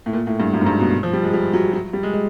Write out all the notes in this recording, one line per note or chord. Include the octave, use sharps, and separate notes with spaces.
A2
A#2
A2
G2
F#2
G#2
G2
B2
F3
G3
G#3
G3
F#3
F#3
G3
G#3
G#3